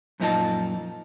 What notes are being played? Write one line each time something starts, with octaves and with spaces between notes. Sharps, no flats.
F#2 A#2 F3 D#4 D#5 A5